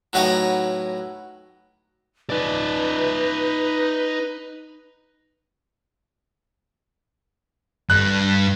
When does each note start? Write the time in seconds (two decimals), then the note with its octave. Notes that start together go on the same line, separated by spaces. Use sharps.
0.13 A2 F#3 B3 D#4 D#5 G5
2.30 D#4 B4 D5
7.90 G2 F#6